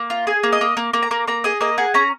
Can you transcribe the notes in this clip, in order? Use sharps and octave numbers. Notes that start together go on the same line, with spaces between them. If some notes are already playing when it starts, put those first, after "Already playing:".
Already playing: A#3
F4
G#4
A#3
D#5
A#3
A#3
A#3
A#5
A#3
A#3 A#5
G#4 D#5
A#3 D#5
G#4 F#5
C#4 A#5